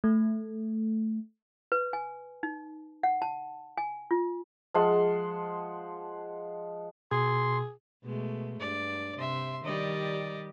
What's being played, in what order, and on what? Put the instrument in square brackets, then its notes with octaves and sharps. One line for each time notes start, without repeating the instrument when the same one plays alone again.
[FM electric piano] A3
[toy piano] B4
G#5
D#4
F#5
A5
G#5
F4
[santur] F3 G#3 F#5 C6
[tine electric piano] B2 [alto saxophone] G#4 [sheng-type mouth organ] C6
[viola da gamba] B2 G#3 A3
[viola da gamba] G2 [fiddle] D5
[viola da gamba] C3 [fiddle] E5 C6
[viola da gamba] D#3 G3 G4 [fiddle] D5 D#5